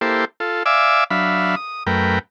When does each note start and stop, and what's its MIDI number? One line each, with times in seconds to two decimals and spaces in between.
0.01 0.25 58
0.01 0.25 64
0.01 0.25 67
0.01 0.25 69
0.01 0.25 72
0.40 0.63 65
0.40 0.63 69
0.66 1.04 74
0.66 1.04 76
0.66 1.04 77
0.66 1.04 80
0.66 1.04 86
0.66 1.04 88
1.11 1.55 54
1.11 1.55 62
1.11 1.55 76
1.11 1.55 77
1.11 1.55 83
1.56 1.83 87
1.87 2.19 42
1.87 2.19 57
1.87 2.19 70
1.87 2.19 71
1.87 2.19 79